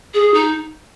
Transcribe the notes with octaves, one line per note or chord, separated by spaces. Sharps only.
G#4
D#4